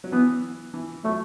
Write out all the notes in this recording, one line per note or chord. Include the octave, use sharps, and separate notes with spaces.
F#3
E3 B3
E3
F#3 A3